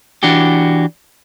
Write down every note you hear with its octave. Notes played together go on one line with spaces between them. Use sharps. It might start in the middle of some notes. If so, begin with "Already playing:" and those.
E3 D4 F#4 G4